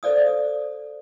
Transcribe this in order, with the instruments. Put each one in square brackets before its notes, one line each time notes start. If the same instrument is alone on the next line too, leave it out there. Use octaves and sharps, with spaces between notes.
[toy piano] A4 C5 D5 F5 D#6